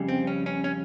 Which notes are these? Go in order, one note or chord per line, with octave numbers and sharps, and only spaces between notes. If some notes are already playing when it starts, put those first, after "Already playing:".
Already playing: F2 C#3 G3
C4
C#4
C#4
C#4